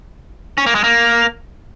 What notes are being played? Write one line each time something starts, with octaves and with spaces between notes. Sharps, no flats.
C#4
A#3
G#3
A#3